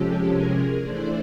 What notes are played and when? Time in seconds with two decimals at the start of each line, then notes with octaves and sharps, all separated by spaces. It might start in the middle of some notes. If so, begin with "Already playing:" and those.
Already playing: C3 F3 G#3 C#4 G4 A4
0.28 G#4 A#4
0.80 E3 A3 D4 C5 D5